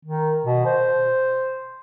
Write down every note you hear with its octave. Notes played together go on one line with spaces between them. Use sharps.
D#3
B2
C5